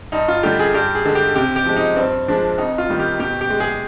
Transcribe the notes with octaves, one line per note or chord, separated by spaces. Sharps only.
G2 D#4
F4
D3 G3 G4
G#4
G2 G4
G#4
D3 G#3
G4
C3 G4
G4
F3 G#3
D#4
G2 C4
F3 G#3 D4
F2 D#4
F4
D#3 G3
G4
B2 G4
G4
G#3
G#4